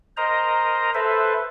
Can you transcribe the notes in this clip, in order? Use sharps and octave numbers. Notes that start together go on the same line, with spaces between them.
A#4 C5 D#5 A#5
A4 B4 C5 E5